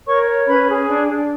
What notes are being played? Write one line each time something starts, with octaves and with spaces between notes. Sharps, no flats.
A#4 C#5 C#6
C#5
C#4 B4 B5
G#4
D4
D4